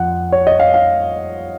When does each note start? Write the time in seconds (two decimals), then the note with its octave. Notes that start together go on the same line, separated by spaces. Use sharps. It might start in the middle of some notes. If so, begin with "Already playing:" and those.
Already playing: F2 F3 F#5
0.32 C#5
0.47 D#5
0.60 F5
0.74 F5